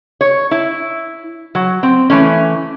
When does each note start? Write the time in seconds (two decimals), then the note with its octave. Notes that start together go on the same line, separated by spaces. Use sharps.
0.21 C#5
0.51 E4
1.55 F#3
1.83 C4
2.10 E3 A3 C#4